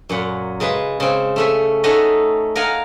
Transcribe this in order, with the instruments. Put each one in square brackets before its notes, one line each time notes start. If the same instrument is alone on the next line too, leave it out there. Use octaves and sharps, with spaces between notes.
[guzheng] F#2 A#2 F#5
C#3 G#3 B4 C6
C#3 C4
A3 C#4 E5
A3 C#4 D#4 D#5 F#5
A#4 D#5 F5 F#5 G#5